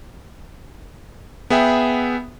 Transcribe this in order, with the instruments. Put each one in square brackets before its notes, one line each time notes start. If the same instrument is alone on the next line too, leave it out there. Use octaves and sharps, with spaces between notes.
[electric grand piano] B3 G#4 E5 G5